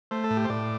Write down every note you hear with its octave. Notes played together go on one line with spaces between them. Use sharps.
A3 C5
A4
A2
G4
C5
A2 D5